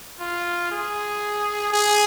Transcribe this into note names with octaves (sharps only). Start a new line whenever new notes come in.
F4
G#4
G#4